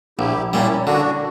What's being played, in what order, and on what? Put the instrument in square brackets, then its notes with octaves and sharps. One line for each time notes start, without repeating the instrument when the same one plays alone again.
[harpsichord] A#1 [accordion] E4 G4
[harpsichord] A#2 G3 [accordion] C#4 E4
[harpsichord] D3 [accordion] D4 F#4